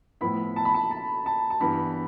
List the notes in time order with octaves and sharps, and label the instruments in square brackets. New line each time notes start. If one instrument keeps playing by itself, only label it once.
[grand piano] A2 F3 B3 E4 [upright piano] B5
[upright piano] A5
B5
A5
A5
A5
A5
[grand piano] G2 E3 B3 [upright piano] B5